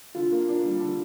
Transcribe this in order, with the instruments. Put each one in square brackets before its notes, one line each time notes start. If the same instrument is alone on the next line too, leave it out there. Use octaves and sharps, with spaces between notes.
[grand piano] D3 [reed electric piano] F4
[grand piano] A#3
D4
G3
D3